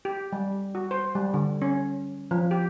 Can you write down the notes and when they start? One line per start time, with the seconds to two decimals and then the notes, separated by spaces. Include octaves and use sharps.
0.05 G4
0.33 G3
0.75 F#4
0.91 C5
1.15 G3
1.34 D3
1.62 C#4
2.31 F3
2.51 G4